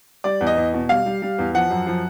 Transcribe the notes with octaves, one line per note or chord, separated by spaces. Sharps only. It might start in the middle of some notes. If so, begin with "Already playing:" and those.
G3 D5
E2
D#5
E2
B2
G3 F5
G3
G3
E2
F3 F#5
F#2
F3